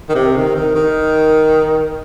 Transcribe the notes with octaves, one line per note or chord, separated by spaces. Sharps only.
D#3
C3
D#3
D#3
D#3